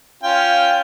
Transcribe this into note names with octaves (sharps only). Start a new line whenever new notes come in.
C#4 F4 G5